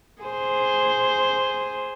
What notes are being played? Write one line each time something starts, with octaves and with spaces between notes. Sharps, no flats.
G#4 C5